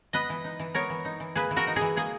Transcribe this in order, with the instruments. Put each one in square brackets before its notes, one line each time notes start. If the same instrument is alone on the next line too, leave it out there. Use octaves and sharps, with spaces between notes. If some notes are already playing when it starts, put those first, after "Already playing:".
[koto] B3 B4 D#5
E3
D#4
E3
B3 A#4 C#5
E3
D#4
E3
A#3 G#4 B4
E3
F#4 A#4
D#4
G#4
E3
A#3 G#4